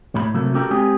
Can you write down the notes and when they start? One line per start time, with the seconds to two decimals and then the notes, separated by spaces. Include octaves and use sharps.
0.15 A2 B5
0.34 C3 F#3 A3 A#3
0.54 C#4 F#4 G4 A4 A#4
0.71 G#3 C4 G4 G#4 G5 G#5